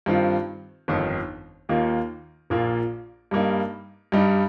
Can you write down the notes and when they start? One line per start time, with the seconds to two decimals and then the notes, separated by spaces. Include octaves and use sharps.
0.06 G2 D#3 C4 F4
0.88 G1 F2 D#3
1.69 D#2 D#3 A#3 F4
2.50 A#1 A#2 A#3 F4
3.31 G2 G3 A#3 D#4
4.12 G2 G3 D#4